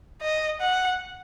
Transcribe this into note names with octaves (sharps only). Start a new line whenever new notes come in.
D#5
F#5